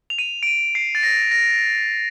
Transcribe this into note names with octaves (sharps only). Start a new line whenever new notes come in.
F7
D#7
D7
D#7
C7
A6
A#6
A#6